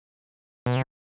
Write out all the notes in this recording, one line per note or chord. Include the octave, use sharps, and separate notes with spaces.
B2
C3